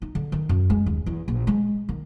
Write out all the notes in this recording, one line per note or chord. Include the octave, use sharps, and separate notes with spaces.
D#4
D3
D#3
F#2
G#3
D#2
E2
A#1
G#3
D#3